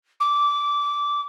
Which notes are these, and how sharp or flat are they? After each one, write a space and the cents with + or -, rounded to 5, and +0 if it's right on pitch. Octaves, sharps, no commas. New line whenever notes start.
D6 -15